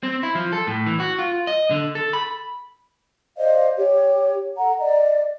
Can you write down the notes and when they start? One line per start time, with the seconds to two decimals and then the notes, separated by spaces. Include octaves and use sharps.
0.03 C4
0.23 E4
0.35 F3
0.53 A4
0.67 A2
0.86 E3
1.00 F#4
1.19 F4
1.47 D#5
1.71 D3
1.95 A4
2.13 B5
3.37 C5 D5 D#5 F5
3.77 G4 C#5
4.57 A4 F#5 A#5
4.79 D5 D#5